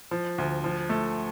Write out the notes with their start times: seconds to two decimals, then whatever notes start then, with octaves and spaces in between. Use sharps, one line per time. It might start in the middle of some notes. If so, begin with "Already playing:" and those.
0.11 F3
0.38 D2
0.64 F3
0.89 A3